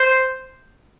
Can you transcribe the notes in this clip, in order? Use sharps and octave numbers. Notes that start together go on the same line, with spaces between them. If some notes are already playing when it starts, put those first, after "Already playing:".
Already playing: C5